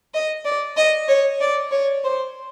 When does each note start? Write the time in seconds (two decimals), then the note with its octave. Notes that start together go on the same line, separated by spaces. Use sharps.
0.14 D#5
0.45 D5
0.77 D#5
1.08 C#5
1.40 D5
1.72 C#5
2.04 C5